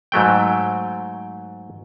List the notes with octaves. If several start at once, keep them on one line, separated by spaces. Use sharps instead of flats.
G#2 F#3 A3 G5